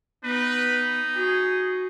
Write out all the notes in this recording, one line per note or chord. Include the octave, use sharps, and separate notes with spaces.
B3 D#4 B4
F#4 G#4